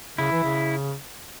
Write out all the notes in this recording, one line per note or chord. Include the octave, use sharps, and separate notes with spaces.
C#3 E4
E3
C#3